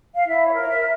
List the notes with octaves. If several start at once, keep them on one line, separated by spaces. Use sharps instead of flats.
F5
E4 E5
C#5
A#4
C#5
E5